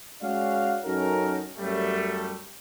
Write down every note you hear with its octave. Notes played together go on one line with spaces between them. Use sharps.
G#3 C#4 F#4 C#5 D5 F5
F#2 C#4 D#4 F#4 A4 A#4
F#2 G3 A3